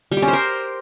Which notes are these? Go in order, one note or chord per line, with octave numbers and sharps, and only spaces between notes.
G3
G4
C#4
C5
A#4